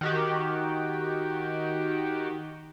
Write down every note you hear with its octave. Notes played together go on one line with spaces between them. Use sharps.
D#3 F#4 G4